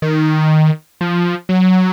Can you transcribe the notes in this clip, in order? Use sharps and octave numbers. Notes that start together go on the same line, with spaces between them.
D#3
F3
F#3